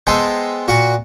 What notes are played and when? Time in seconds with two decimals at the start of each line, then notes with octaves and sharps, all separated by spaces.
0.07 G#3 B3 G#4 A4 C5 G5
0.68 A#2 F#4 F#5 C#6